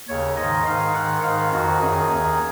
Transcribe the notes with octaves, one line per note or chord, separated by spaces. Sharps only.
D#2 C#3 C#5
G#2 D#3 D#5
G#2 D#3 F5
G#2 D#3 F#5
G#2 D#3 F5
F2 D#3 F#4
F#2 D#3 G#4
D#2 D#3